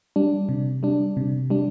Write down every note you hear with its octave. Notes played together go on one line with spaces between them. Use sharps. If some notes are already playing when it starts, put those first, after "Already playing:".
G3 D4
C3
G3 D4
C3
G3 D4